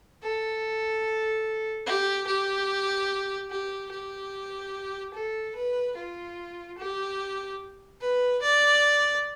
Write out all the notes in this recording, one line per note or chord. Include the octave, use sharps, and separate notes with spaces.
A4
G4
G4
G4
G4
A4
B4
F4
G4
B4
D5